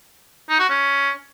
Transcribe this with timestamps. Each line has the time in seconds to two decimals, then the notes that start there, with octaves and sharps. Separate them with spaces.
0.49 D#4
0.59 F#4
0.70 C#4